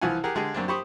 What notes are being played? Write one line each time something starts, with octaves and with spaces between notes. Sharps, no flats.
C2 E3 F3 F4 F#5 G#5
G4 G#4 A#4 F#5
D3 G#3 G4 G#4
F#2 A#3 C4 D4
G4 C5 B5 C#6 D#6